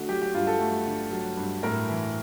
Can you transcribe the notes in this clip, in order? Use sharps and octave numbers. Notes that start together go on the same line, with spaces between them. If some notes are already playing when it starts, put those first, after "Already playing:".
Already playing: D3 A3 F#4
F#3 G4
G4
G2 F4
A4
A3
D3
F#3
G2
A2 A#4
E3